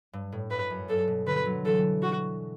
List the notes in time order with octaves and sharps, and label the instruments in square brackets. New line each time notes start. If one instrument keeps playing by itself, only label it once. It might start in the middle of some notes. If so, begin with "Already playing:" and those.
[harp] G2
A2
[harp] G2 [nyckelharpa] B4
[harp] F#2
[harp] G2 [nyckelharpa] A4
[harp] B2
[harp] D3 [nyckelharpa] B4
[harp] F#3
[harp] E3 [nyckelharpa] A4
[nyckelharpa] F#4